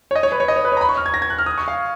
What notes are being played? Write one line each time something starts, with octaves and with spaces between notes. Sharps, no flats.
C#5
D#5
C#5
B4
C#5
D#5
C#5
B4
C#5
A#5
B5
C#6
F6
G#6
A#6
G#6
F#6
F6
D#6
C#6
F5